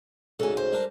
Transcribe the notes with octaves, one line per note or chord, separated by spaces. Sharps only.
D2 G#2 C#3 A4 G#5
C5
G3 D4 A#4